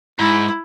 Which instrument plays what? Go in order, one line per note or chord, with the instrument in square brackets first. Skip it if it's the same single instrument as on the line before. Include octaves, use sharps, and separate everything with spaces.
[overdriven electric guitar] G#2 [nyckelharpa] E4